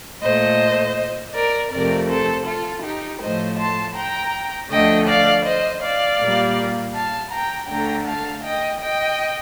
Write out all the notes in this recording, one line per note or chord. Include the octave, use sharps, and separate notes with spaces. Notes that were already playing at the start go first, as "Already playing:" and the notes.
A#2 A3 C5 D#5
A#4 D5
F2 C3 F3 A3 A#4 D5
A4 C5
F4 A4
D#4 G4
A2 F3 A3 C5 D#5
A5 C6
G5 A#5
D2 D3 F3 A3 D#5 G5
D5 F5
C5 D#5
D5 F5
A#2 G3 A#3
F5 A5
G5 A#5
D2 D3 A3 G5 A#5
F5 A5
D#5 G5
D#5 G5